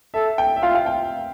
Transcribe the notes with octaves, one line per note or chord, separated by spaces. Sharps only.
A4 E5
G5
E5
F4 F5
F5
G5